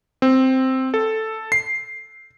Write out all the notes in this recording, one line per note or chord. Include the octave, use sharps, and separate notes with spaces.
C4
A4
C7